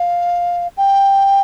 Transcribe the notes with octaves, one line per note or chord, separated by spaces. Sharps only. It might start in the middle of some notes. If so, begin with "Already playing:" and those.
Already playing: F5
G5